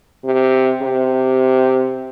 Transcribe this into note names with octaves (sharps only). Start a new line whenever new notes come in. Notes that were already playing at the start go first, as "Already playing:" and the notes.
C3
C3